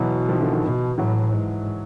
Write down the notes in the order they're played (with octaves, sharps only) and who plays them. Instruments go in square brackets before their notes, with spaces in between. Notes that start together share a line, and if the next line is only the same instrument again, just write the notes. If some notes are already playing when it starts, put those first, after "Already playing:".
Already playing: [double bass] B2 [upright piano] E3 F#3
[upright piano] D#3 F3
D3 E3
D#3 F3
[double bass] B2
[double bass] A2 [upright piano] E3 F#3
[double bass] G#2